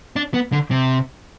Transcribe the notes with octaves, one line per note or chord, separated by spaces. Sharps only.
D4
B3
D3
C3